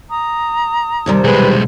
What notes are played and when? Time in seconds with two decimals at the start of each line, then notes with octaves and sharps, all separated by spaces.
0.10 A#5 D#6
1.06 D#2 C3 G3
1.24 B1 G#3 G#4 B4 G5